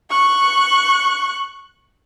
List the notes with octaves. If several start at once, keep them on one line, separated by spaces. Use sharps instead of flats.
C#6 F#6